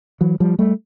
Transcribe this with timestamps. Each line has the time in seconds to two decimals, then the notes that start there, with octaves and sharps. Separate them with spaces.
0.21 E3 F#3
0.40 F3 G3
0.59 G3 A3